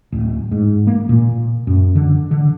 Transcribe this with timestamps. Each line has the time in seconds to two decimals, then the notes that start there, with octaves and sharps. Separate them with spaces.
0.12 D1
0.51 G#2
0.87 A#3
1.09 A#2
1.67 F#2
1.95 D3
2.31 D3